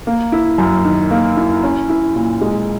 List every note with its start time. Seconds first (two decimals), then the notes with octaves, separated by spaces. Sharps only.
0.07 A#3
0.32 E4
0.58 F#2
0.85 D#3
1.11 A#3
1.37 E4
1.63 C#4
1.89 E4
2.15 A#2
2.41 G#3